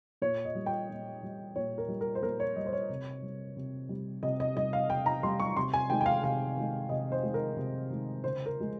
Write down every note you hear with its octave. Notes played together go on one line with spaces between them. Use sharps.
A#2 C#5
D#5
G3
G5
A#2
G3
A#2 C#5
A#4
G3
A#4
C5
A#2 A#4
C#5
G3 D#5
C5
C#5
C3
G3
C3
G3
C3 D#5
D#5
G3 D#5
F5
C3 G5
A#5
G3 C6
C#6
C3 C6
G#5
D#3 G#3 G5
G5
F5
C3 F5
D#3 G#3
C3 D#5
C5
D#3 G#3
A#4
C3
D#3 G#3
C#3 C5
A#4
F3 G#3